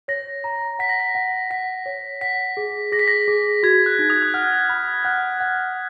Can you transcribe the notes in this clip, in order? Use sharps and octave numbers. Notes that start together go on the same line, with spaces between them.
C#5 A#6
A#5
F#5 B6
A#6
B6
F#5
F#5 B6
C#5
F#5 B6
G#4
G#4 A#6
B6
A#6
G#4
F#4 G#6
F#6
D#4
D#6
F#6
F#5 F6
B5
F#5 F#6
F#5